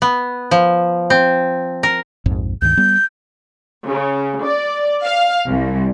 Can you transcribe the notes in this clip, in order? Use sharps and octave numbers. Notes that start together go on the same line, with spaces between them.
B3
F3
C4
A#4
A#1 F2 G#2
C#2 G2 D#3 G6
G3 B3
C#3
D5
F5
C2